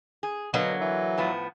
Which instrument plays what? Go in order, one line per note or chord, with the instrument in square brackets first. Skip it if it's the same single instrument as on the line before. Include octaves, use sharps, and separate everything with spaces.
[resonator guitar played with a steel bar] G#4
[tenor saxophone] B2 [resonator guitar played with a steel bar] D3 A#3 [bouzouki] F#3
[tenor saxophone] E3
[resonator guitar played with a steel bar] A2 F3 B3